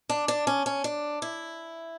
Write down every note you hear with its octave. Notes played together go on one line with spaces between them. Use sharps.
D4
D4
C#4
C#4
D4
E4